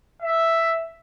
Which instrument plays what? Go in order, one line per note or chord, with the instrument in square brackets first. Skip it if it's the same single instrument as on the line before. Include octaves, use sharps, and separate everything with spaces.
[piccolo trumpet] E5